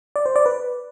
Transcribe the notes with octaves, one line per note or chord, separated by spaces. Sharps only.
D5
C5
D5
B4